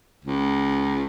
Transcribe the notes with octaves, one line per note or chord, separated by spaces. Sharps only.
C#2